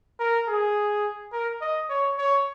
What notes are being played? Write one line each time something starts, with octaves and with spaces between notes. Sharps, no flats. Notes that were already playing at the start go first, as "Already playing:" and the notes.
A#4
G#4
A#4
D#5
C#5
C#5